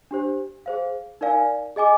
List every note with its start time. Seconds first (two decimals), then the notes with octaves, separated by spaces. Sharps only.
0.11 D4 G4 C5
0.66 G#4 C5 F5
1.21 D#4 A#4 D5 F5 G#5
1.76 G#4 D#5 G#5 D6